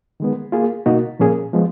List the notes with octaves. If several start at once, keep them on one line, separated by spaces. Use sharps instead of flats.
D#3 G#3 B3
A#3 F4 G#4
B2 A#3 D#4 F#4
A#2 F3 A#3 C#4 G#4
F3 G#3 B3